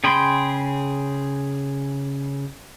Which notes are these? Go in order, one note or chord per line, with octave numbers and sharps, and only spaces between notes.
C#3 G#4 G5 B5 C6